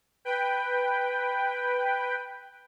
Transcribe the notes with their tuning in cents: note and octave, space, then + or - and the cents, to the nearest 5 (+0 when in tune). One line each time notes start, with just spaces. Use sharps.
B4 +0 G5 +5